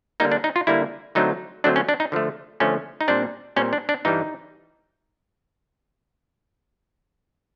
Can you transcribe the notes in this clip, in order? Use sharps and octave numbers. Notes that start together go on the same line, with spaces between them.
D3 G3 A#3 D#4
D4
D#4
F4
D3 G3 A#3 E4
D3 F#3 A3 C4 D#4
D3 F#3 A3 C4 D4
C#4
D4
D#4
D3 F3 A3
D3 F3 A3 C#4
D#4
A#2 G3 C4 D4
A#2 G3 C4 C#4
D4
D4
G2 E3 G3 D#4